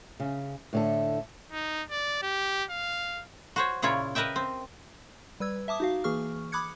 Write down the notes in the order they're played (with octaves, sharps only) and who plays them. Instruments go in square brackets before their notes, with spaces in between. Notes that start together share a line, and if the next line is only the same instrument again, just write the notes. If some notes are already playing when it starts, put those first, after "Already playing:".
[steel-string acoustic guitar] C#3
A2 D3 A4
[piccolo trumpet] D#4
D5
G4
F5
[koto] F#4 C5 C#5
A#2 C#3 E4 F4 C#5
A#4 B4 D#5 E5 G5
C4
[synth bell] G3 B4 E6 G#6
E5 A5 D6 D#6
D#4 F#4 F5
E3 A#3 G#4 C#6 F6
B5 D6 D#6 F#6 G#6 C#7